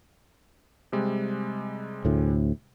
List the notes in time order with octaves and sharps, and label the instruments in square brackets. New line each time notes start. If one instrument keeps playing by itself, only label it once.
[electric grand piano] C3 G3 G#3
[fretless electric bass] D2 A2